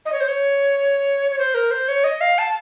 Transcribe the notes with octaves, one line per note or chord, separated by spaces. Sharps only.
D#5
C#5
C5
C#5
C#5
C5
A#4
C5
C#5
D#5
F5
A5